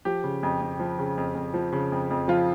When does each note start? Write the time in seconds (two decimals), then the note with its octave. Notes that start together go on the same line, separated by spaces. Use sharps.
0.05 F3 G4
0.24 C#3
0.43 F2
0.61 F2
0.79 F3
0.99 C#3
1.18 F2
1.35 F2
1.54 F3
1.73 C#3
1.92 F2
2.11 F2
2.28 F3 F4